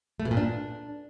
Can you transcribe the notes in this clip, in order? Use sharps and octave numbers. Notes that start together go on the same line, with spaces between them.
A3
B2
A#2
D4